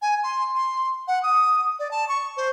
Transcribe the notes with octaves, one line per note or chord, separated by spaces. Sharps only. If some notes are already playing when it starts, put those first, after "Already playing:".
G#5
C6
C6
F#5
D#6
D5
A5
C#6
C5